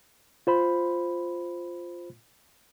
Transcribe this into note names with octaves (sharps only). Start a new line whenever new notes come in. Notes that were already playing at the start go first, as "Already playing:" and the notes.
F4 C5 B5